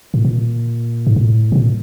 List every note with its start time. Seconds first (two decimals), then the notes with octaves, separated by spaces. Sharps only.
0.14 A2
0.25 A#2
1.07 G#2
1.16 A2
1.52 B2
1.56 A#2